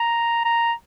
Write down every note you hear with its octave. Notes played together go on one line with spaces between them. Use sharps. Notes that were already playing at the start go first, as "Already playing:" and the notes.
Already playing: A#5
A#5